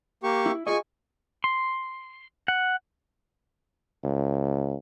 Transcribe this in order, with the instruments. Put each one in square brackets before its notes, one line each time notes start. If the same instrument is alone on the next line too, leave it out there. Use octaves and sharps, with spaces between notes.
[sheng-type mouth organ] A#3 G4 C#6
[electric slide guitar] E4
[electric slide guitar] F4 G#4 D#5 [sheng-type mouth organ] G#5 C#6
[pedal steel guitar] C6
F#5
[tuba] C#2